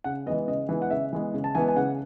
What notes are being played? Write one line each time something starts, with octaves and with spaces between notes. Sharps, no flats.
C#3 F#5
E3 G#3 B3 D#5
C#3 D#5
E3 G#3 B3
F#5
C#3 E5
E3 G#3 B3
C#3
A5
E3 G#3 B3 G#5
G#5
C#3 F#5